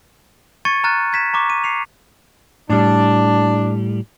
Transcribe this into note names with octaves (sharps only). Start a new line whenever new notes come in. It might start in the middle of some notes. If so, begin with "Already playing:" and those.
C#6 G#6 A6 C#7 D#7
A#5 F6 F#6 A6 D#7
G#6 B6 E7
A#5 C#6 D6
D#7
C7 C#7 F7
A2 G3 D4